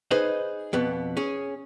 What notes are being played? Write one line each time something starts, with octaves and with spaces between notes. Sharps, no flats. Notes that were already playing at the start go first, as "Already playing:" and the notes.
D#4 G#4 B4 C5 D#5
F2 B2 B3
C#4 G#4